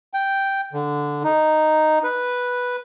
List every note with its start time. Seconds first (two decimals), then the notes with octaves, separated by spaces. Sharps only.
0.14 G5
0.73 D3
1.24 D#4
2.03 B4